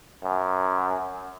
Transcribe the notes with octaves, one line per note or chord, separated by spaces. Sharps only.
F#2